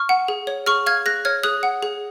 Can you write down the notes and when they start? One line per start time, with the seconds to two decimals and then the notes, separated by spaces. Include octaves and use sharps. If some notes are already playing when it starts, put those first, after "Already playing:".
Already playing: C#6 F6
0.09 F#5
0.28 G#4
0.47 C#5
0.66 G#4 C#6 F6
0.86 F5 F6 G#6
1.06 G#4 F#6 A#6
1.25 C#5 F6 G#6
1.44 G#4 D#6 F#6
1.63 F#5
1.83 G#4